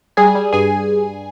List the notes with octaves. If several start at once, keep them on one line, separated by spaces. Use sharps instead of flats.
G3 G#4 G#5
G3
G2 G#4 G#5